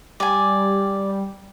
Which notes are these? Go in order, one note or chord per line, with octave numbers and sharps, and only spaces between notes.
G3 D5 G#5